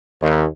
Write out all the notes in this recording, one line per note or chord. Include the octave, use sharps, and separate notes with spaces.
D#2